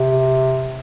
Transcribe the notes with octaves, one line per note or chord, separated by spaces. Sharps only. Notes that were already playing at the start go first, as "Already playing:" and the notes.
Already playing: C3